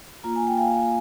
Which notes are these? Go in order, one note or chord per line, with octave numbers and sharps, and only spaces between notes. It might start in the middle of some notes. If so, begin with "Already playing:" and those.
A#3 F4 A#5
G#5
G5
F5 G#5